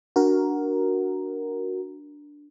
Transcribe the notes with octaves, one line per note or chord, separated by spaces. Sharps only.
D4 F#4 A#4